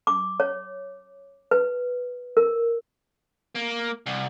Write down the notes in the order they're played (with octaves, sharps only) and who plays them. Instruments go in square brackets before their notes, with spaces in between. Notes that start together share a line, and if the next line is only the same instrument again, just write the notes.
[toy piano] D6
C#5
B4
A#4
[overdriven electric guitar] A#3
C2